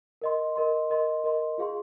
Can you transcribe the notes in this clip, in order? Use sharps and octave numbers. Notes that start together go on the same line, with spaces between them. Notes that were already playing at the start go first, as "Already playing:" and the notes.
A#4 D#5 C6
A#4 D#5 C6
A#4 D#5 C6
A#4 D#5 C6
F4 G#4 F5 C6